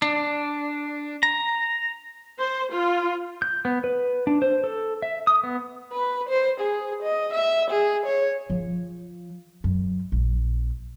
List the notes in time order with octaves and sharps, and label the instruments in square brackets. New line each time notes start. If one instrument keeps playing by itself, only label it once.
[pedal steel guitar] D4
A#5
[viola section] C5
F4
[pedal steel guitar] G6
B3
B4
D4
C5
A4
E5
D#6
B3
[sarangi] B4
C5
G#4
D#5
E5
G#4
C#5
[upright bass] F3
F#2
A#1